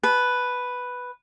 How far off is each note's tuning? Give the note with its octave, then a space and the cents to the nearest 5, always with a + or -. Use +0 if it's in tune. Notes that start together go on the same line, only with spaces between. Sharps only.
B4 +0 A5 -25